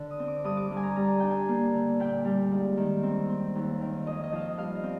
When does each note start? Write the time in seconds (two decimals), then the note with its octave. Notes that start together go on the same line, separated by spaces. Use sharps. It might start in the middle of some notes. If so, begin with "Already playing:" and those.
Already playing: D3
0.11 D#6
0.20 C4
0.28 D6
0.44 G2 D#6
0.57 D6
0.71 G2
0.77 G#5
0.83 A#5
0.96 G3 A#5
1.08 G#5
1.20 D4 G5
1.31 G#5
1.49 A#3
1.74 D3
2.00 A#2 G5
2.25 G3
2.52 G#2
2.77 D#3
3.03 C4
3.29 C4
3.55 D#2
3.81 D#3
4.06 F2 D#5
4.24 D#5
4.32 F3 F5
4.41 D#5
4.57 G2 F5
4.75 D#5
4.84 C4